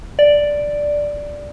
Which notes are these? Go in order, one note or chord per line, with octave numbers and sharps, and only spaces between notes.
D5